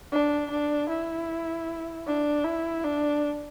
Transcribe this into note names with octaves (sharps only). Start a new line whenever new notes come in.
D4
D4
E4
D4
E4
D4